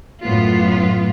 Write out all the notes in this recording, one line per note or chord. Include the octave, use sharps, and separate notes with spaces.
F#2 A2 B3 F4